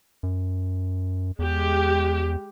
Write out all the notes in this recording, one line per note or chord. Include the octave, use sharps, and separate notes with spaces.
F#2
E2 G#3 G4